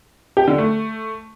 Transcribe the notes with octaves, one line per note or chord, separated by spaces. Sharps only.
G4
D3
A3